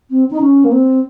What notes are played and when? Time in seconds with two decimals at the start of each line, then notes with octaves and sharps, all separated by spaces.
0.11 C4
0.31 D#4
0.40 C#4
0.64 A#3
0.72 C4